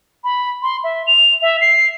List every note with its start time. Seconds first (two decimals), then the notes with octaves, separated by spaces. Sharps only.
0.24 B5
0.63 C6
0.84 E5
1.07 F7
1.42 E5
1.61 C7